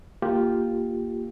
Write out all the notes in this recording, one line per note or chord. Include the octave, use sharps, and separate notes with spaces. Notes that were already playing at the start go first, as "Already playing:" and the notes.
A#3 F4 G4